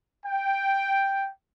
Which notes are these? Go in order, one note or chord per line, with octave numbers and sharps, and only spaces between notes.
G5